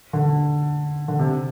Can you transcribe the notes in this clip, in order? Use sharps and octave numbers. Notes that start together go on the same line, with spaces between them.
D3
D3
C3